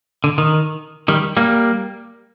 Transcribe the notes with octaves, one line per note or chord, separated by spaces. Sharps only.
D3
D#3
D#3 G3
G3 A#3